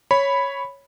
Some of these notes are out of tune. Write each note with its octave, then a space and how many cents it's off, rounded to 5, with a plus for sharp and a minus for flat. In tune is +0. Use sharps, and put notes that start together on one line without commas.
C#5 +0 B5 +0